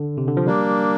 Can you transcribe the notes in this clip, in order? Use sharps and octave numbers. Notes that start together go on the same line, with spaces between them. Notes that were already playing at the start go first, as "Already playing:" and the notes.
Already playing: D3
C3
D3
F3
G3 A#3 D4